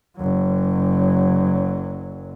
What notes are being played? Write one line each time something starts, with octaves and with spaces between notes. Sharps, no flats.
F#1 F#3